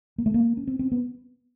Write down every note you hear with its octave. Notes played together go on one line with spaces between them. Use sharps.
A#3
A3
A#3
C#4
C4
C4
B3